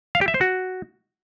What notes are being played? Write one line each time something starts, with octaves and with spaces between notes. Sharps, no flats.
F5
G4
E5
C5
F#4